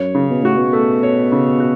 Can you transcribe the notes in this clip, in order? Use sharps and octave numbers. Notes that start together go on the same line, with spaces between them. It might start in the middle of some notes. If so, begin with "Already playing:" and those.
Already playing: F#2 C#5
C#3
B2
A2 F#4
B2
A3
C#5
C#3
F#4